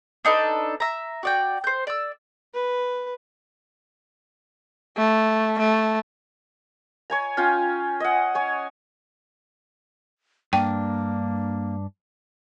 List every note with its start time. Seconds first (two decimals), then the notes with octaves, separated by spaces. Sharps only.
0.25 D4 D#4 A4 B4
0.80 E5 A#5
1.23 F#4 D5 G5
1.64 C5 G6
1.87 D5 E6
2.54 B4
4.97 A3
5.59 A3
7.10 C#5 G#5 A#5
7.37 C#4 F4 G5 G#5
8.00 D#5 F#5
8.35 C#5 G#5
10.53 G2 A#3 D4 G5